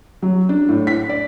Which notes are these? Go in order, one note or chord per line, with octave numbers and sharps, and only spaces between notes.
F#3
D4
A2
B6
D5